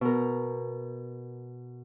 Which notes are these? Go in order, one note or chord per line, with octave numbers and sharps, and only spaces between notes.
B2 A#4